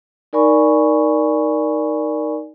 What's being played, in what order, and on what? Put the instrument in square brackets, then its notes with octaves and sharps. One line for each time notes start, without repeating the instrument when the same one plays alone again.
[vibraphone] D#4 A#4 D5 G#5 B5 C#6